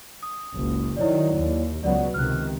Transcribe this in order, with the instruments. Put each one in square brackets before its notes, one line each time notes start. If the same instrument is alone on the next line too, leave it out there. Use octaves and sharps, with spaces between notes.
[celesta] D#6
[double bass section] F#1 C#2
[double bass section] D#3 F#3 [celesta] E4 C#5 D5
[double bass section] D#2
[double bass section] C#2 F#3 B3 [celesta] D5 F#5
[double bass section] C#2 C3 D#3 [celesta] F6 F#6